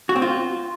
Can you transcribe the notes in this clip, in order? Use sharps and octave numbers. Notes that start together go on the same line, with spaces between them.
F#4
C4
F4